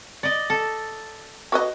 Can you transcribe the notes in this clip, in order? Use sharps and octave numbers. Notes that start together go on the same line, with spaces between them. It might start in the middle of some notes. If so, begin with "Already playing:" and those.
D5 D#5
A4
F#4 B4 D#5